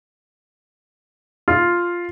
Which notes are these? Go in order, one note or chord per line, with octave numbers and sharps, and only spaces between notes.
F4